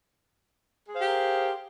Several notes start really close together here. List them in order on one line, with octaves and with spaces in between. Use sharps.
G#4 C5 F5 G4 A#4